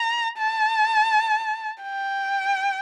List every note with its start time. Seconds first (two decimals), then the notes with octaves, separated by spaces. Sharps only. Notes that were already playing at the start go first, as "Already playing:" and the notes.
Already playing: A#5
0.38 A5
1.83 G5